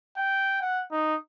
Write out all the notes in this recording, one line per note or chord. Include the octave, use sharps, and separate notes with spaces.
G5
F#5
D#4